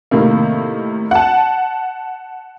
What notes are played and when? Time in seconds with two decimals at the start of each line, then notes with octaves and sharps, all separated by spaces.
0.11 A2 C3 D#3 A#3
1.11 F#5 A5